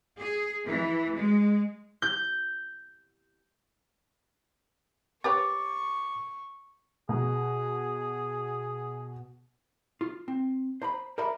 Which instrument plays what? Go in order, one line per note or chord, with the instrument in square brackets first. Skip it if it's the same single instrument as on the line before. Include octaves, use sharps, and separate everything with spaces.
[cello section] G#4
E3
G#3
[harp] G6
[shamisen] G4 B4 C#5 [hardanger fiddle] C#6 [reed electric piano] D6 A6
[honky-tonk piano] B2 [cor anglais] G#4
[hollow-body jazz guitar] F4
C4
C5 A#5 B5
A#4 C5 D5 E5 A#5 B5